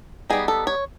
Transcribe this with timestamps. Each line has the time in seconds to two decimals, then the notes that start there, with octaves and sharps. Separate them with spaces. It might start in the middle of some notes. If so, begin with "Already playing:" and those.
0.30 G3 B3 D#4 G#4
0.48 A4
0.67 C#5